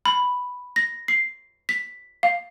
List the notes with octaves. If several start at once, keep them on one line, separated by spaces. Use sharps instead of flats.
B5
A#6
C7
B6
F5